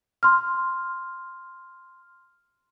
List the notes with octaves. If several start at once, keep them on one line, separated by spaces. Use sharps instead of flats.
C6 F6